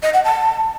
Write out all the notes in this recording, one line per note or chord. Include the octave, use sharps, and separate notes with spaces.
D#5
F#5
A5